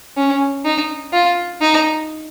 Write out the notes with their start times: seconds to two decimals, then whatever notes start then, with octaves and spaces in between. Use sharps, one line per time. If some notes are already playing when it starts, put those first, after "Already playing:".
0.17 C#4
0.65 D#4
1.13 F4
1.61 D#4